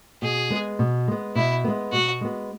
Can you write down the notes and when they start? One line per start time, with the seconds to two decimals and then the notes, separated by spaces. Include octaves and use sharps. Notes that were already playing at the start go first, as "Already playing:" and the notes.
0.22 B2 G#4
0.50 G#3 B3
0.79 B2
1.08 G#3 B3
1.35 B2 E4
1.64 G#3 B3
1.92 B2 F#4
2.21 G#3 B3